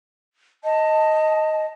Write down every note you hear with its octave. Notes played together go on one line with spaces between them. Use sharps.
D#5 A5